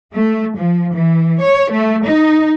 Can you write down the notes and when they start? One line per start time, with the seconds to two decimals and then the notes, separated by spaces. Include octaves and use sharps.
0.13 A3
0.57 F3
0.95 E3
1.40 C#5
1.72 A3
2.06 D#4